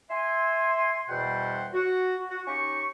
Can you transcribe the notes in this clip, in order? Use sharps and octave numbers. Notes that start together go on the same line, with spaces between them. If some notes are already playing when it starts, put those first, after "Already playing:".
E5 G#5 C6
E2 B2 G3 C5 F#5 G5
F#4
F#4
C#4 D#4 G4 C#6